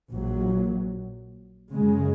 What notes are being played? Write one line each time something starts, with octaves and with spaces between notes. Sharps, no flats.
A#1 A#2 F#3
F#2 C#3 G#3